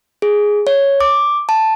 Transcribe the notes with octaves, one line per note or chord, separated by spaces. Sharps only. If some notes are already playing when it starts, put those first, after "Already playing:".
G#4
C#5
D6
A5